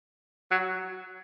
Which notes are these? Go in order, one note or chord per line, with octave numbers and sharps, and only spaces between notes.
F#3